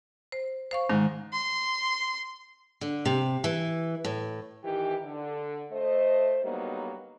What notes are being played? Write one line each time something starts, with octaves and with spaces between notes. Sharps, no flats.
C5
C5 F5 C#6
G#2 D#3
C6
D3
C3
E3
A2
D#3 E3 G4
D3
A3 C5 D#5
D3 F#3 G3 A#3 B3 D#4